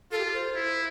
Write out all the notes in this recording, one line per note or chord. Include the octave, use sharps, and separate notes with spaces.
F4 A4
G4
A4
C5
E4